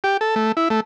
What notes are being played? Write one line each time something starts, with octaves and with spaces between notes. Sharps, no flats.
G4
A4
A3
E4
A3